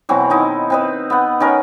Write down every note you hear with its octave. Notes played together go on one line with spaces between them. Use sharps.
B2 E3 F#3 C4
D#3 D#4 E4
C4 B4 D#5
B3 F#5
D#3 C#4 A#4 B4